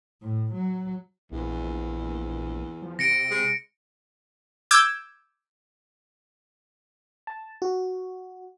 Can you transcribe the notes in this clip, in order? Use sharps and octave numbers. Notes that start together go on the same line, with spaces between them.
A2
F#3
A#1 E2
F3
C3 A#6 C#7 D7
G#3
D6 E6 G6 G#6
A5
F#4